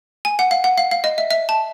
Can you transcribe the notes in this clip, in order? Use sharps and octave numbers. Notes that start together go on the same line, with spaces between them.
G#5
F#5
F5
F#5
F5
F5
D#5
E5
E5
A5